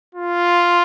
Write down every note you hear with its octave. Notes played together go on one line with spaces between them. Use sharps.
F4